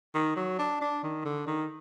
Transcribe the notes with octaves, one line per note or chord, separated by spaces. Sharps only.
D#3
F#3
D4
D4
D#3
D3
D#3